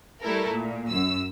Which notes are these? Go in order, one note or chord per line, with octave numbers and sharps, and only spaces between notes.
G3 A3 E4 A4 A#4
A#2
F#2 E6